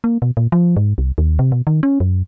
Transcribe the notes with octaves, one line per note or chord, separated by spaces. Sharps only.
A#3
B2
A#2
F3
G#2
C2
D#2
C3
B2
D#3
C#4
F#2